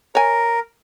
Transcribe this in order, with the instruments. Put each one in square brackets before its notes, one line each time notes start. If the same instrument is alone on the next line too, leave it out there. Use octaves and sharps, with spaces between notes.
[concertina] A#4 [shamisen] C#5 G#5